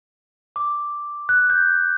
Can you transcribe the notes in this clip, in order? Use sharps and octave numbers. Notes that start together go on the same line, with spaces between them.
D6
F#6
G6